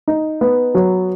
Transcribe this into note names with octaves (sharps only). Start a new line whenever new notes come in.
D#4
B3
F#3